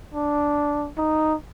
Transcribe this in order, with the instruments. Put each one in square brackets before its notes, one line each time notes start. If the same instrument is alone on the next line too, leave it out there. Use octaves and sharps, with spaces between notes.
[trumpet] D4
D#4